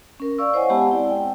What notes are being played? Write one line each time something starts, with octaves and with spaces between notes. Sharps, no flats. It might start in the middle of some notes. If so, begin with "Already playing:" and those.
C#4 A#4
D5 F5 C#6 E6
E4 C5 C#5 D#5 F#5 G#5
G#3 B3 G4 F#5 G#5 A5
C4 E4 D5
G5